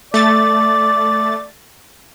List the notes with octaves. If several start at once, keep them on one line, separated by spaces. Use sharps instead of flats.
A3 D5 A6